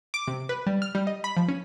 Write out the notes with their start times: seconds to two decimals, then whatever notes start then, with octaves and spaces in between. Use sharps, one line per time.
0.14 D6
0.28 C3
0.49 B4
0.66 G3
0.82 F6
0.95 G3
1.07 D#5
1.24 B5
1.37 F3
1.48 C#4